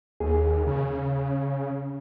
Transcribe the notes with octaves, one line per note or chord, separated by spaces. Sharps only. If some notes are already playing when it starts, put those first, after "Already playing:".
D#2 G#4
C#3